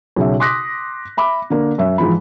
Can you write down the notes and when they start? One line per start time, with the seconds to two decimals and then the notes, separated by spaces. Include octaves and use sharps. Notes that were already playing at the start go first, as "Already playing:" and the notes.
0.16 B1 C#3 E5
0.40 C6 D6 D#6 F#6 A#6 B6
1.17 E5 B5 D6
1.50 D3 A#3
1.78 F#2 E5
1.98 G#2 E3 F3 B5